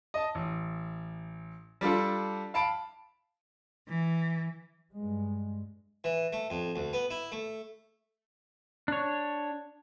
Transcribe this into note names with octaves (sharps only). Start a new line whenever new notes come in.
D#5 A5
A1
G3 D4 F4 A4
F5 A5 B5 D7
E3
G2 G#3
E3
A3
F2
D2
B3
E4
A3
D4 C#5